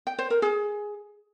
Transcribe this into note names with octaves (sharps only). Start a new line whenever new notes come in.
G5
C5
A#4
G#4